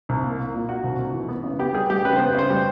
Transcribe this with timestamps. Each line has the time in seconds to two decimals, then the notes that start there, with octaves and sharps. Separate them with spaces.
0.09 C2
0.24 A#3
0.39 A#3
0.54 A#2
0.69 A#2 F#4
0.84 C2
0.99 C2
1.14 E3
1.28 B3
1.44 C#3
1.59 B3 G4
1.74 G3 G#4
1.90 G3 G4
2.05 C#3 B4
2.16 B3 C5
2.35 C#3 C5
2.50 G3